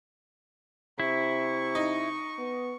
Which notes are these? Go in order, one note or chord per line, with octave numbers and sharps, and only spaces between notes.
C3 E4 C#6
D#4
B3